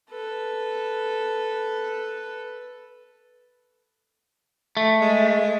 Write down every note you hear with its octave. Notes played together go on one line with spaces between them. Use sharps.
A4 B4
A3
G#3